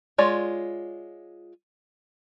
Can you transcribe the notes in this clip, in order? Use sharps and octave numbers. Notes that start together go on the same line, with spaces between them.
G#3 F4 C#5 D5